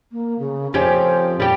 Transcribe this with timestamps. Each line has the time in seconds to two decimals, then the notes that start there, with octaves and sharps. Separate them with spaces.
0.12 A#3
0.39 C#3
0.74 F2 C#4 G4 C5
1.40 G3 G4